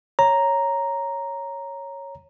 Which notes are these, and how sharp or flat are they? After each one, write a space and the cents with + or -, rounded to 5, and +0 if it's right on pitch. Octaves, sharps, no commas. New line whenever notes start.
C#5 -5 A#5 +0